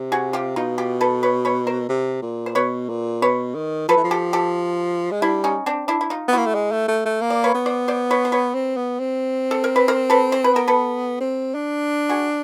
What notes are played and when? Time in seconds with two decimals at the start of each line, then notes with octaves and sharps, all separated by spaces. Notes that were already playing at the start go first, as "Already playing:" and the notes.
Already playing: C3
0.12 F#4 G#4
0.33 F4 G4
0.56 B2 D#4 F4
0.78 F4 G4
1.01 A4 B4
1.23 B4 C#5
1.45 B4 C#5
1.67 A#4 C5
1.89 C3
2.22 A#2
2.46 C5
2.55 B2 B4 C#5
2.89 A#2
3.22 B2 B4 C#5
3.55 D#3
3.88 F3 A4 B4
3.97 E3
4.04 F3
4.11 G4 A4
4.33 G4 A4
5.11 G#3
5.22 G3 D4 E4
5.44 C#4 D#4
5.66 C4 D4
5.88 D4 E4
6.01 E4
6.10 D#4 F4
6.28 B3
6.33 A#3 E4 F#4
6.46 A3
6.55 G#3
6.72 A3
6.88 A3
7.05 A3
7.21 A#3
7.30 D5
7.44 B4 C#5
7.55 B3
7.66 C5 D5
7.88 C5 D5
8.11 B4 C#5
8.25 C5
8.32 B4 C#5
8.54 C4
8.77 B3
9.00 C4
9.51 A4
9.64 A#4
9.76 B4
9.88 A#4 C5
10.10 A4 B4
10.32 C5
10.44 B4
10.54 B3 A#4
10.68 A4 B4
11.20 C4
11.55 D4
12.09 F#4 G#4